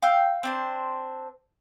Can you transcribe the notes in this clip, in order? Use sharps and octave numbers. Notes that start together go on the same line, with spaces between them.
F5 G5 E6 G6
C4 D4 C5